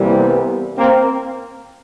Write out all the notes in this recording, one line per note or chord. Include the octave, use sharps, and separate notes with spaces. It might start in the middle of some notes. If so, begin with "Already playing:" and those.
Already playing: C2 C3 E3 G3 A#3
B3
A#3 C4